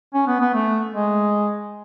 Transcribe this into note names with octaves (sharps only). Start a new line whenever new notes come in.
C#4
B3
B3
A3
G#3